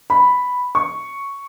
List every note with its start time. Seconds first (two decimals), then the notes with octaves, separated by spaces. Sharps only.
0.10 B5
0.75 C#6